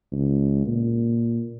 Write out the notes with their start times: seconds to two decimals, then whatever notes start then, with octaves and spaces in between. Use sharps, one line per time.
0.12 C#2
0.67 A#2